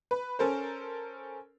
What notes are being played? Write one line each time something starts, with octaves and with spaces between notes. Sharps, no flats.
B4
C#4 A4 A#4 C5